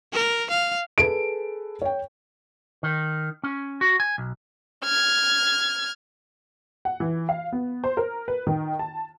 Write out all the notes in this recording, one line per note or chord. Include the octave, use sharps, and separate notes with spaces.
A#4
F5
G#4 A4 B4 D7
C#5 G5
D#3
C#4
F#4
G#5
B1
F6 G#6
F#5
E3
F5
B3
C5
A#4
B4
D#3
A5